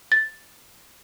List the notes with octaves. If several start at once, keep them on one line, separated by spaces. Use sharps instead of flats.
A6